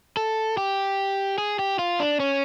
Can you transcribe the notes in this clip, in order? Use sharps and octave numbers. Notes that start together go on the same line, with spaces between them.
A4
G4
G#4
G4
F4
D4
C#4